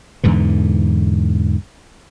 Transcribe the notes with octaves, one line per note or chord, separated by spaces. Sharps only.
E2 G#2 D3 E3